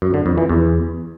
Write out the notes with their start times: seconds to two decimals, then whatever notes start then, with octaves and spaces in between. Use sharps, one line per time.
0.02 F#2
0.14 D3
0.26 F2
0.38 E3
0.49 E2